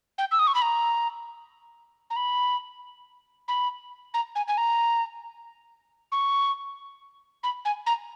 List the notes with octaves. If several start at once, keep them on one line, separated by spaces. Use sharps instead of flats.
G5
E6
D#6
C#6
B5
A#5
A#5
B5
B5
A#5
G#5
G#5
A#5
C#6
B5
G#5
A#5